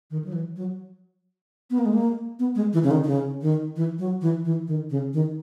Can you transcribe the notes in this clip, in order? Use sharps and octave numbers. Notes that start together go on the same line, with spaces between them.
D#3
F#3
E3
F#3
B3
A#3
G#3
A#3
B3
G#3
E3
C#3
D#3
D#3
C#3
D#3
E3
F#3
E3
E3
D#3
C#3
D#3